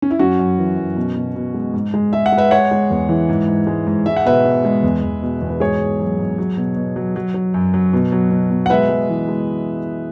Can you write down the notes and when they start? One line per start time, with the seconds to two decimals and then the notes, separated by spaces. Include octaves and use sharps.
0.02 C#4
0.11 E4
0.19 F#2 C#4 F#4
0.39 F#2
0.58 E3
0.77 F#2
0.96 B2
1.17 B2
1.36 B2
1.54 G#3
1.74 G#2
1.94 G#3
2.13 G#3 E5
2.26 F#5
2.32 G#3
2.38 B4 E5
2.51 G#3 C#5 F#5
2.71 G#3
2.90 E2
3.09 E3
3.29 G#2
3.47 G#2
3.67 G#3
3.87 G#2
4.06 G#3 E5
4.17 F#5
4.26 B2 B4 E5
4.45 G#3
4.65 G#3
4.83 E2
5.03 E2
5.23 B2
5.41 E2
5.50 B4
5.60 G#2 G#4 C#5
5.80 G#2
6.00 F#3
6.19 G#2
6.38 F#3
6.57 B2
6.77 B2
6.96 F#3
7.16 F#3
7.34 F#3
7.54 F#2
7.74 F#3
7.93 B2
8.12 F#3
8.31 B2
8.51 B2
8.66 F#5
8.70 G#3 B4 E5
8.89 G#3
9.09 E3
9.28 G#3